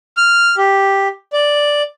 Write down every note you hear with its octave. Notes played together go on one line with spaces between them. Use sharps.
F6
G4
D5